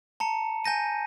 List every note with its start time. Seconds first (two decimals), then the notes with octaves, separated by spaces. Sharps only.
0.20 A5 A#5 C#7
0.65 G#5 G6 A#6 D#7